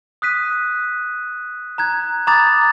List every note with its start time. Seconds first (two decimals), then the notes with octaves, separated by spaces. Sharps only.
0.22 D#6 F#6 B6 D#7
1.78 A#5 F#6 G#6
2.27 A#5 B5 D6 D#6 G#6 A6